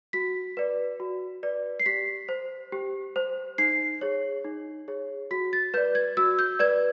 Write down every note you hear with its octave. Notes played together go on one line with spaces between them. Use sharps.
F#4 B6
B4 D5
F#4
B4 D5
C7
G4 B6
C5
G4
C5
D#4 C7
G#4 C#5
D#4
G#4 C#5
F#4 B6
A6
B4 D5 G6
G#6
F#4 E6
G6
B4 D5 G#6